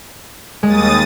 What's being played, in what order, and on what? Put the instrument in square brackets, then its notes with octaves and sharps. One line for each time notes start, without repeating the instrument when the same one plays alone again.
[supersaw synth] D#2 D#6 A6 [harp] G#3